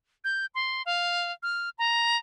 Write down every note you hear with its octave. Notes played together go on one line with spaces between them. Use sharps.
G6
C6
F5
F6
A#5